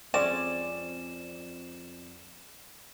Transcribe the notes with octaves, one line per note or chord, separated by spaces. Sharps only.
F2 G#3 C4 C#4 D5 E7